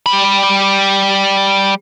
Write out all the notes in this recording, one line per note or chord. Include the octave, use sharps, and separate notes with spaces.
G3 B5